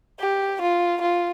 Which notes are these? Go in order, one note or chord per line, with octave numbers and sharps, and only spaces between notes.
G4
F4
F4